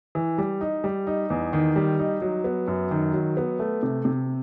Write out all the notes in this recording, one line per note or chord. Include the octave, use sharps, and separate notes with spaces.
E3
G3
D#4
G3
D#4
E2
D#3
G3
D#4
F#3
B3
F#2
D#3
F#3
B3
A3
C3
C3